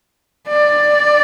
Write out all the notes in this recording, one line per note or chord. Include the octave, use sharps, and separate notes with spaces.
D5